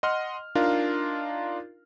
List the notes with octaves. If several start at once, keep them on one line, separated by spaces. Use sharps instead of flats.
D#5 F#5 C6 F6
D4 D#4 F4 A#4 F5